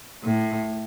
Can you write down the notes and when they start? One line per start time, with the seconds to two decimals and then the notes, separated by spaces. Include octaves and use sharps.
0.24 A2